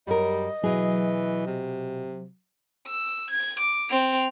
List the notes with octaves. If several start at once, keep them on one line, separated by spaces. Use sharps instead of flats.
F#2 G3 A#4 D#5
B2 E3 F#3 G#4
C3
E6
G#6
D6
C4 F7